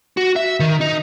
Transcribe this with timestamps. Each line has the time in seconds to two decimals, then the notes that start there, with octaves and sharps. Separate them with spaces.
0.17 F#4
0.36 E5
0.60 D#3
0.81 D#4